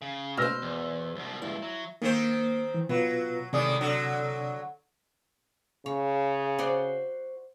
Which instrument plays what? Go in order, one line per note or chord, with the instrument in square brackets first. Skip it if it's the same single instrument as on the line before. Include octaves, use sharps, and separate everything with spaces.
[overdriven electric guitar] C#3
[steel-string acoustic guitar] B2 C5 [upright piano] E6 F6 A#6
[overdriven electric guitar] E2
C2 B2
[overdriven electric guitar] C#2 G2 [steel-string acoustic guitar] E4
[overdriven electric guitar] F#3
[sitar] D#3 C4 C5 [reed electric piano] A#3
[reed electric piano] E3
[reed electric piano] B2 F4 B4 [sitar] F#3
[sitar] A2 D#3 G#3 [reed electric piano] C3 D5 D#6
[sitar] D3 F#3
[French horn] C#3 [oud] C#5
[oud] F#4 C5 D5